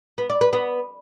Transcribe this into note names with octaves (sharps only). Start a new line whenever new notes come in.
B3
D5
B4
B3